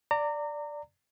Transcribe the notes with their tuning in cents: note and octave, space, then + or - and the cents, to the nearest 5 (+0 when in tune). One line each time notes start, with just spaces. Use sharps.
D5 +0 A#5 -30